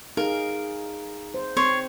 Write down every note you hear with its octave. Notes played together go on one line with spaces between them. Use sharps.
D#4 G#4 A#4 F5
C5
C4 C#5 C6